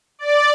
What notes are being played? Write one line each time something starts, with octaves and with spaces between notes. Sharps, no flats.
D5